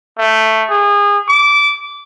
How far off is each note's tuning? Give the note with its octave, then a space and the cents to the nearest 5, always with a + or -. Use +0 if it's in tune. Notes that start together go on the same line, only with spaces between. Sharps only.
A3 +5
G#4 -30
D6 -20